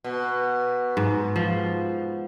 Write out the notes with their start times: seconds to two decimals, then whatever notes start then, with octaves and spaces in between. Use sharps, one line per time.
0.04 B2
0.97 G#2
1.36 F3